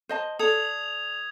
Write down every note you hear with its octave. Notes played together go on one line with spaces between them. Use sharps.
C5 D#5 A5
A4 D5 D#6 G#6 F7